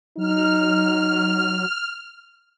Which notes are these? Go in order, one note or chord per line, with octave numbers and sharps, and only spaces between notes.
F#3 D#4 F6